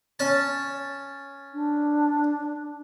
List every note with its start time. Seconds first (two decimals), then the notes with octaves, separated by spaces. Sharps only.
0.19 C#4 A5
1.54 D4